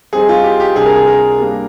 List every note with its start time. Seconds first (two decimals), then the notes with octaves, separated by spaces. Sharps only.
0.13 G3 C4 D#4 G#4
0.29 F4
0.44 G4
0.60 G4
0.76 C3 G3 D4 F4 G#4
0.86 A#4
0.96 G#4
1.07 A#4
1.39 G3 A#3 D4